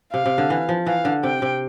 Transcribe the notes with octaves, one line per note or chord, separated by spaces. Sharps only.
C3 F5
C3
D3
E3
F3
E3 F5
D3
C3 G5
C3